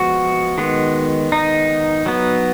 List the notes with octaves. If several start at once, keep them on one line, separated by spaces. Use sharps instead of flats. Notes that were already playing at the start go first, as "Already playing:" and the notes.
Already playing: F3 G#3 B3 F#4
D#3 G#3 B3
D#4
F#3 B3